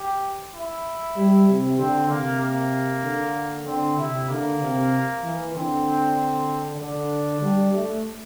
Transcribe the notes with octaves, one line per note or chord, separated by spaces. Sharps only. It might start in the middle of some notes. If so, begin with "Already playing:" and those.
Already playing: G4
E4
G3
C3
D3 C4
C3 A#3
A#3
D3
D3 C4
C3 E4
D3 A#3
C3
E3
D3 C4
D3 D4
G3
A3